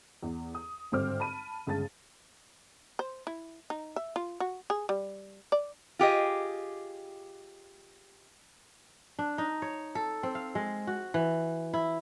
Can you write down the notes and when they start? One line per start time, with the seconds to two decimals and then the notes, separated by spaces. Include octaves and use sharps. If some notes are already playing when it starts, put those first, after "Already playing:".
0.23 E2
0.55 D#6
0.92 G#1 G2 D3 C4 D6 F6
1.20 A5 B5 D#7
1.67 G1 C#3 G#3 A5 A6
2.99 C5
3.27 E4
3.70 D#4
3.96 E5
4.16 F4
4.40 F#4
4.70 G#4
4.89 G3
5.52 D5
5.99 F4 G4 G#4 D#5
9.19 D4
9.38 D#4
9.62 C#5
9.95 A4
10.23 C4
10.35 F5
10.55 G#3
10.87 F#4
11.14 E3
11.73 E4